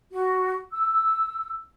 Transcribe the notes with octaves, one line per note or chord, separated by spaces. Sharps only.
F#4
E6